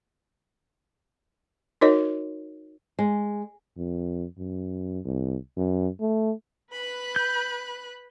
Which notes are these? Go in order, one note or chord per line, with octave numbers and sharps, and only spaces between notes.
D#4 F#4 A#4 C#5 D#5
G#3
F2
F#2
C2
F#2
A3
B4 B5 F#6
G6